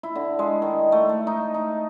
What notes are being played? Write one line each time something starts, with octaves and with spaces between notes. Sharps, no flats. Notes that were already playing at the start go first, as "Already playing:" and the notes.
E4
D3
G#3
D#3
A3
A3
D#4
D#4